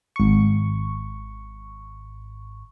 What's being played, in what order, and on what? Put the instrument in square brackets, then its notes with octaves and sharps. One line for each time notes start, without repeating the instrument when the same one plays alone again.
[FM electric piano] G#1 C#6